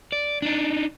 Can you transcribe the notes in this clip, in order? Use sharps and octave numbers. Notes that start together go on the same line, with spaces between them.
D5
D4 D#4